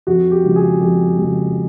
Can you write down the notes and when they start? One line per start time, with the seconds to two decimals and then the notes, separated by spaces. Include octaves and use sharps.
0.07 F2 F#4
0.31 G4
0.44 C#3 F3 G#3
0.56 G#4
0.80 F2 G4
1.18 C#3 F3 G#3